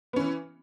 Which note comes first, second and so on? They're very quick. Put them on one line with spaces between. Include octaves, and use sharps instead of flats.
B3 C#4 E3